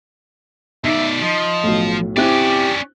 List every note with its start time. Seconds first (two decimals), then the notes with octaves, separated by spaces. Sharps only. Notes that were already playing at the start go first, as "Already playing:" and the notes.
0.84 B2 D#4 D5 E5
1.22 F3 D#5
1.63 B1 A2
2.17 C4 C#4 E4 G4 D5 F#6